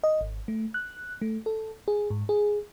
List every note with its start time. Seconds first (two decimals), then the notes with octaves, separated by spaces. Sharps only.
0.04 D#5
0.21 G#1
0.48 A3
0.74 F#6
1.22 A3
1.46 A4
1.88 G#4
2.10 G#2
2.29 G#4